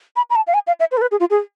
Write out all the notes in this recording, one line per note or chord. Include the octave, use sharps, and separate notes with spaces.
B5
B5
A5
F5
G#5
F5
E5
C5
A4
B4
G#4
F4
G#4